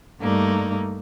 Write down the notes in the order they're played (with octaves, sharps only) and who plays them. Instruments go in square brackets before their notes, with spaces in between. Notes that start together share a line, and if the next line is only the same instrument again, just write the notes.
[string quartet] G2 G3 A3 A#3 D#4